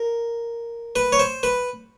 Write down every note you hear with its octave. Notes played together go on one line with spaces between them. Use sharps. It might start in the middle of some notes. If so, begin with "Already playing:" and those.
Already playing: A#4
B4
C#5
C5
B4